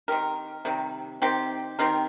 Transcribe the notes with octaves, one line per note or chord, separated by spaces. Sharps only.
D#3 C4 G4 A#4
C3 D#3 G3
D#3 C4 G4
D#3 C4 G4 A#4